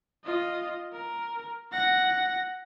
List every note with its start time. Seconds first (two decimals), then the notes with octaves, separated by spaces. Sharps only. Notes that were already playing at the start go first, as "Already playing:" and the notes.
0.24 F4 D#5
0.93 A#4
1.72 F#5 A#6